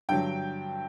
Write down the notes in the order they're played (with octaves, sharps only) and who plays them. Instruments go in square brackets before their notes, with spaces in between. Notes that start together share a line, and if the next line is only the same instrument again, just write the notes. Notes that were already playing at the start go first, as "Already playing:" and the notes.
[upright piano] G2 D3 F#3 G5